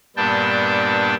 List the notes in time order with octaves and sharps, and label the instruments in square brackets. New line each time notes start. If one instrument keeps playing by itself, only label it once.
[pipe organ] G2 A#2 B3 D4 G5 A5